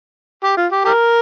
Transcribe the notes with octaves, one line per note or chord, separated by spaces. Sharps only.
G4
F4
G4
G4 A#4